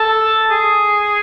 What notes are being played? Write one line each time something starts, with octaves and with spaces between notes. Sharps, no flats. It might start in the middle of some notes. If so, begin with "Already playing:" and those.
Already playing: A4
G#4